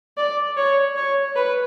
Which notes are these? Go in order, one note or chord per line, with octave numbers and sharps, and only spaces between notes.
D5
C#5
C#5
B4